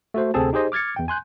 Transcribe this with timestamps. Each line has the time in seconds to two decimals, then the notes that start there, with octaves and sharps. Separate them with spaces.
0.14 A3 F#4 C5
0.34 D2 C3 C4 G#4 A4 A5
0.53 D#4 G4 G#4 C5 D#5
0.72 D6 F6 G#6 A6 C#7
0.96 E2 G5
1.08 G#5 C6 F#6 G6